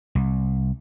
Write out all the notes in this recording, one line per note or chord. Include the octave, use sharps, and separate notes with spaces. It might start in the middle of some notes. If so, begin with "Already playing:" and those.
C2